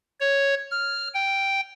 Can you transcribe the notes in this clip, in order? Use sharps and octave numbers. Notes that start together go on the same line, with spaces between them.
C#5
F6
G5